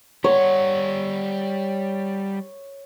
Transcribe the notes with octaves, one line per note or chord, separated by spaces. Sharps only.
G3 C#5 F#5